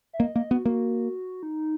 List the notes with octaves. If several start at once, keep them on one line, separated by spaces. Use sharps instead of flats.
E5
A#3 D#5
A#3 D#5
B3 F#4
A#3 F#4
D#4